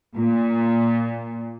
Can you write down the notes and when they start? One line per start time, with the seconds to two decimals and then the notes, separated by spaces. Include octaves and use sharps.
0.15 A#2